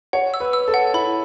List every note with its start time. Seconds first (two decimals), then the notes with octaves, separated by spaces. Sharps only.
0.13 C#5 F#5
0.34 E6
0.40 B4
0.53 E6
0.68 A4
0.74 F#5
0.94 E4 B5